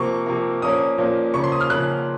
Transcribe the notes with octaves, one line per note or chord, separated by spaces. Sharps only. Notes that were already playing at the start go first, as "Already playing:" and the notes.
Already playing: C3 F3 A#3 C#6
C3 F3 A#3
A#2 F3 A#3 C#4 D#6
A#2 F3 A#3 C#4
C#3 F3 A#3 C#4 C#6
C6
D#6
F6
C#3 F3 A#3 C#4 F#6